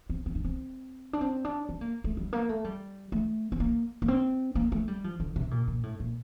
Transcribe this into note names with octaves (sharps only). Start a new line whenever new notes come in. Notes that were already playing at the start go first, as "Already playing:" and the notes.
C4
C4
D4
C4
D4
C4
D4
C4
A#3
A3
G3
A#3
A3
G3
A3
C4
A#3
A#3
C4
A#3
A3
G3
F3
D3
C3
A#2
A#2
A2
A#2